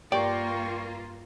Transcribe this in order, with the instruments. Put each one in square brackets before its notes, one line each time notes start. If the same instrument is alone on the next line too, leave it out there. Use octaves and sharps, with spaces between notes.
[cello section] G2 A#3 F4 [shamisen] G4 [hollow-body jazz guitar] D5 [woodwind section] G5 C#6